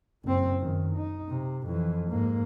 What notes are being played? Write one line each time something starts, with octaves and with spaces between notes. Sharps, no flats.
F#1 C4
F#2 D#3
D#4
C3
F2 E3
G#2 A#3